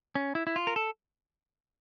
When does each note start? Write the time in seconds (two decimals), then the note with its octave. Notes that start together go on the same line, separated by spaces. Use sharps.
0.15 C#4
0.35 E4
0.47 E4
0.56 F4
0.67 A#4
0.76 A4